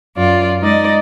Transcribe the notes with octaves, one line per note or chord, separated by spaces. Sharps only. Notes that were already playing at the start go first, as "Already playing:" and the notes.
F#2 F4 D5
G#3 D#4 D5 D#5